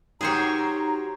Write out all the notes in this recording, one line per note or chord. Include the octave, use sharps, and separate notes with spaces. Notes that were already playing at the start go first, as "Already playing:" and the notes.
F#3 D#4 G4 G#4 A#4 C5 C#5 A#5